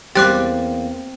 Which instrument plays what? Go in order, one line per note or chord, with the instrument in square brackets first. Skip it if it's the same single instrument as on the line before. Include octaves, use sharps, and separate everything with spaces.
[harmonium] E2 A#3 [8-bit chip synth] G3 G4 [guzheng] C4 [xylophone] D6 F#6 A6